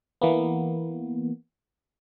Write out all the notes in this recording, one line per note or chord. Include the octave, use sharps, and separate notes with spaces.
E3 A#3 B3